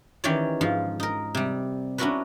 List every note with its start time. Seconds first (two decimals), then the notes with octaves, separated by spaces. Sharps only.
0.24 D#3 E3 C#4 G4 C#5 D5
0.61 G#2 F3 F4
1.00 D#4 A#4
1.35 C3 G3
1.98 C#4 D4 E4 F#4 A#4 B4